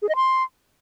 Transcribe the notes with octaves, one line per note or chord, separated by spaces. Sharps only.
G#4
D#5
C6